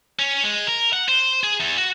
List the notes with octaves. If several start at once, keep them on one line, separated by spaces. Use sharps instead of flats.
C#4
G#3
A#4
F#5
C5
G#4
E2
F#4